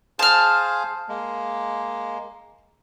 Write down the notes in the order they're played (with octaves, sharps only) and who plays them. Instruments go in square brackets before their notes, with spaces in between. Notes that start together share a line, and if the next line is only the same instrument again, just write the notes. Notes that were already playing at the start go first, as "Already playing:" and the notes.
[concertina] G#4 C5 F5 [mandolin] A5 F6
[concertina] G#3 A#3